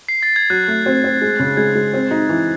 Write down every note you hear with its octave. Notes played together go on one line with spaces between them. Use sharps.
C7
A6
G#6
F#3 F#6
A3
C4
C4
G#3
C#3
G#3 G#6
G#3
C4
D#4
E3